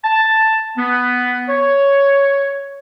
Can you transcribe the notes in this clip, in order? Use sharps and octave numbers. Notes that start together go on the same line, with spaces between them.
A5
B3
C#5